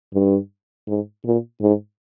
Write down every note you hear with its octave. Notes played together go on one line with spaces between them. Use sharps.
G2
G#2
A#2
G#2